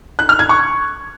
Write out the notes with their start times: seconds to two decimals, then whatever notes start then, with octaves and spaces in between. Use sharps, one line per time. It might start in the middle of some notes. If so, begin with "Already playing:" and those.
0.19 F#6
0.29 F6
0.39 G#6
0.49 C#6